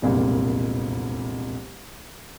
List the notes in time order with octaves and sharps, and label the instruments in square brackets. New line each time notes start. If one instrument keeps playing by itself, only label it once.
[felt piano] E1 C2 F2 A#2